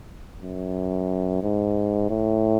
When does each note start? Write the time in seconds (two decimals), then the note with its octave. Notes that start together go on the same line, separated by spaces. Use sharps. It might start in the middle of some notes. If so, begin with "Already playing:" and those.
0.41 F#2
1.42 G#2
2.10 A2